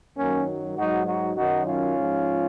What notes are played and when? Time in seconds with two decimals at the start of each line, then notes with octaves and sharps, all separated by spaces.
0.17 F#2 D#3 F#3 A#3 C#4
0.77 G#2 F#3 D#4 F#4
1.07 D#4 F#4
1.36 F#2 D#3 F#3 D#4 F#4
1.66 C#4 F4
1.97 G#2 F3